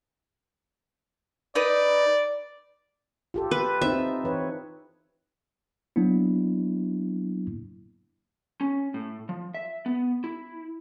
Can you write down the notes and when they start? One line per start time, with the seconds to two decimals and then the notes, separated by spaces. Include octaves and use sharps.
1.55 D#4 B4 D5
3.34 F4 G4 A4
3.51 B4
3.82 C4 D#4 E5
4.24 E3 B4 C#5
5.96 F#3 A#3 B3 D4 E4
8.61 C#4
8.94 A2
9.29 F3
9.54 E5
9.86 B3
10.24 E4